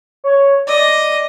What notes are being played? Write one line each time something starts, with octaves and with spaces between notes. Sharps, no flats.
C#5
D5 D#5